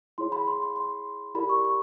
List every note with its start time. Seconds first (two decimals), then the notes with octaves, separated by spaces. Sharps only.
0.18 E4 G#4 C#5 C6
0.32 B5
0.47 C6
0.62 C6
0.76 C6
1.35 E4 G4 A#4 D5 B5
1.49 C#6
1.65 C#6